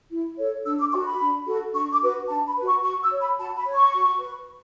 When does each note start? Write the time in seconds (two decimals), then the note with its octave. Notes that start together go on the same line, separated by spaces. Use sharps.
0.11 E4
0.37 A4 C#5
0.65 D4 E6
0.79 D6
0.92 F#4 A4 C#6
1.05 B5
1.20 D4
1.46 F#4 A4
1.74 D4 C#6
1.93 D6
2.02 F#4 B4
2.28 D4 A5
2.47 B5
2.57 F#4 B4
2.66 C#6
2.83 F#4 C#6
3.02 E6
3.12 C#5
3.21 B5
3.38 F#4 A5
3.57 B5
3.65 C#5
3.74 C#6
3.93 F#4
4.20 B4